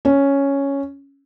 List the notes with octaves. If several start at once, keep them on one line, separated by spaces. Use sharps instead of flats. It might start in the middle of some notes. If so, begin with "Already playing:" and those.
C#4